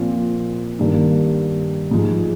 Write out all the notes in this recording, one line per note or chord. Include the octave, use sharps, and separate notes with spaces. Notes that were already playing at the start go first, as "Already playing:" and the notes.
Already playing: A#2 F3 C4 F4
G2 D#3 G3 A#3
G#2 F3 G#3